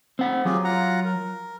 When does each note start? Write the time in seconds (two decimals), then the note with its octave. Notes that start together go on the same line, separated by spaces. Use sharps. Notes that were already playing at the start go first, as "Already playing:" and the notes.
0.19 C4 F#5
0.45 F#3 F4 G4 G#4
0.64 F4 F#5 A#5
1.05 A#4